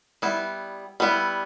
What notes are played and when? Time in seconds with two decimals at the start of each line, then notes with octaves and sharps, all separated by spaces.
0.22 G3 B3 E4
1.00 G3 B3 E4